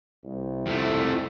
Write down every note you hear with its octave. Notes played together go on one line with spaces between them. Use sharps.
C2
F2 A3